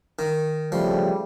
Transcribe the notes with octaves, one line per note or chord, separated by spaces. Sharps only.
D#3
C#3 F3 G3 A3